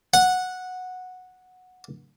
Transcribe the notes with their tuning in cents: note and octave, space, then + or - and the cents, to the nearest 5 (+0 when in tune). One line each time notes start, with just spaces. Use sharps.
F#5 -10